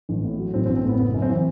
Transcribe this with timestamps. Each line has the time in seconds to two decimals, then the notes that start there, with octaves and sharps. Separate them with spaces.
0.09 A1
0.24 A2
0.39 F#3
0.54 A1 C4
0.66 C4
0.69 A1
0.76 C4
0.85 A2 B3
0.99 F#1 B3
1.14 F#2
1.22 C4
1.29 E3